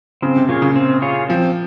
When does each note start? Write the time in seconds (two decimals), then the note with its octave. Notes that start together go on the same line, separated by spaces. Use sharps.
0.22 C#3 C4
0.36 C3
0.49 A#2 F4 G#4 C#5
0.62 C#3
0.76 C4
1.02 F4 G#4 C#5
1.29 F3 C4